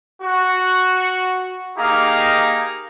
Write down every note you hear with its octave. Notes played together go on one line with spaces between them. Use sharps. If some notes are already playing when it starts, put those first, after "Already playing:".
F#4
A#3 D#4 G4 G#4 F5 A#5